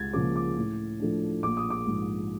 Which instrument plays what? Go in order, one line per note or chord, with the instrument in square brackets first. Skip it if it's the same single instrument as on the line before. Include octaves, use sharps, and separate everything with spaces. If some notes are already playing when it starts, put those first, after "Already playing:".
Already playing: [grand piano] C#2 G#6 A6
C#3 F3 A#3 C#4 D6
D6
A2
F3 A3 D4
A#1 D6
D#6
D6
G#2 F3